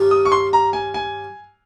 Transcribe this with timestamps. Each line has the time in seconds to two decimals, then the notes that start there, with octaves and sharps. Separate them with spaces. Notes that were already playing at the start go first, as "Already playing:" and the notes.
Already playing: G2 D#3 G3 C#4 F4
0.11 D#6
0.25 C#6
0.32 C6
0.53 A#5
0.73 G#5
0.94 G#5